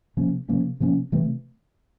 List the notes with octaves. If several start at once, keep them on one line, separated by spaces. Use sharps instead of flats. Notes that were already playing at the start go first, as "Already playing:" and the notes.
C3 F3 A#3 C#4
C3 F3 A#3 C#4
C3 F3 A#3 C#4
C3 E3 A3 C4